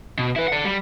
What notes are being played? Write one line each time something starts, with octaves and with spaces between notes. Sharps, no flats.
B2
E4 B4
D5 F#5
G3